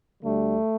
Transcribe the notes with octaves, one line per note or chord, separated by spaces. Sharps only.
D2 D3 G3 A3